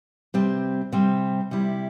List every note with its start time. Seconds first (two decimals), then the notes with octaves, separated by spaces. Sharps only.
0.34 C3 G3 C4
0.92 C3 G3 C4
1.51 C3 G3 E4